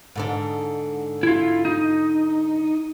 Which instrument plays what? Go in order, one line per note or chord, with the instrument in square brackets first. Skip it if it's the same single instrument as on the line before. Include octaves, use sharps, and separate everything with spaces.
[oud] G#2 D3 D4
[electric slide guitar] E4 F4
D#4